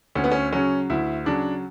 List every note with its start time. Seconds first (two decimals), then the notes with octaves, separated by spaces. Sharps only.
0.15 D2 C#4
0.24 B3
0.31 C#4
0.53 C#3 F#3 C#4
0.90 D2 E4
1.25 C#3 F#3 D4